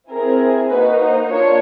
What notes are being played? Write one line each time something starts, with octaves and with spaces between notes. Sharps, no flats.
C4 E4 G#4 A#4
A#3 D#4 F#4 B4
C5
A#3 D4 F4 C#5